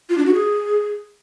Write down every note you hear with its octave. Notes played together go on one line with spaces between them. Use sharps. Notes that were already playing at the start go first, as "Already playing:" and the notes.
F4
D4
F#4
G#4